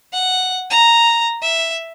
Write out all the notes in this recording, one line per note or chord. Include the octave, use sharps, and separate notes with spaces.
F#5
A#5
E5